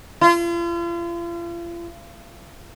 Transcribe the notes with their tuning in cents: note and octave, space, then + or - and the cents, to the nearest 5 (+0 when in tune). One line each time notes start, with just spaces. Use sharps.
F4 -40